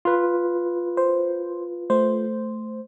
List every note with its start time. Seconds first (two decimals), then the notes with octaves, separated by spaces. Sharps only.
0.05 F4 B4
0.97 C5
1.90 A3 C5